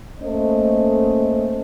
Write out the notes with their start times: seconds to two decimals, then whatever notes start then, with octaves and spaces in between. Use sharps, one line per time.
0.21 A3 A#3 C#4 C5 D#5